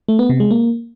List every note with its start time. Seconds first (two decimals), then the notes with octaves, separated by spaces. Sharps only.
0.09 A3
0.19 B3
0.30 C3
0.40 G#3
0.51 A#3